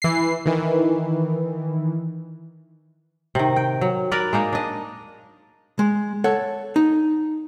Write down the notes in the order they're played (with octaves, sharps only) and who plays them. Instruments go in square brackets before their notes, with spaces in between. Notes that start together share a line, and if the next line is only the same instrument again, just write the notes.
[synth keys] E3 C7
D#3 E3
[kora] C3 D#3
G5
F#3
A#4 B4 D5
G#3 A#3 D#4
D4 D#5
[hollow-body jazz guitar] G#3
A4 C#5 F#5
D#4